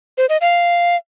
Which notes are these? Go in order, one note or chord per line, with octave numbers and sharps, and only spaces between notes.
C5
D#5
F5